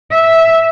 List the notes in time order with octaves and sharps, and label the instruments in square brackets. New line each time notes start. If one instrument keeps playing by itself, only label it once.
[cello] E5